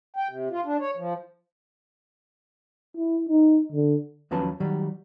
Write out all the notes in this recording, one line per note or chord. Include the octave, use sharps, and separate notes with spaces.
G5
C3
F4
D4
C#5
F3
E4
D#4
D3
D#2 F3 F#3 C#4 B4 A5
D#3 F#3 G3